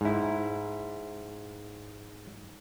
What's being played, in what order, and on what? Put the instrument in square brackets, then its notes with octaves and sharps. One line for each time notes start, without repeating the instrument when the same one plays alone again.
[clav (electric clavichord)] G#2 E4